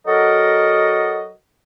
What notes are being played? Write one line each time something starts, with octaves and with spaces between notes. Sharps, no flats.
F#3 F#4 A4 A#4 D#5